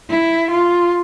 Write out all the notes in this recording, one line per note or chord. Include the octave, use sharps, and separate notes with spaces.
E4
F4